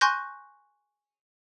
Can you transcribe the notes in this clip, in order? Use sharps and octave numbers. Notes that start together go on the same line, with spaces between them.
G#5 C6 C#6 F#6 G6 A#6